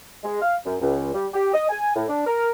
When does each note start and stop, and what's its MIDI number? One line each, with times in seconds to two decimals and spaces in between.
0.24 0.39 56
0.42 0.56 77
0.66 0.75 42
0.81 1.09 37
1.14 1.26 55
1.33 1.50 67
1.54 1.65 75
1.70 1.93 80
1.96 2.04 45
2.09 2.22 62
2.26 2.50 70